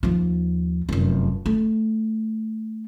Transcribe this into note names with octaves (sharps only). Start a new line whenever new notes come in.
D#2 F3
F1 F#2
A3